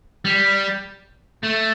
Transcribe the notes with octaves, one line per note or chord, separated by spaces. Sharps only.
G3
A3